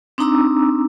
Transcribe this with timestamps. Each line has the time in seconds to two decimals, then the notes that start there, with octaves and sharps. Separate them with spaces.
0.18 C4 D4 D#4 A#5 D6 E6